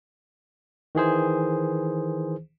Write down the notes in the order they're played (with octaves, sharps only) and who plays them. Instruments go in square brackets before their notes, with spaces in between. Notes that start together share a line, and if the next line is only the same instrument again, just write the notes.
[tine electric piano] D#3 E3 G#4 C5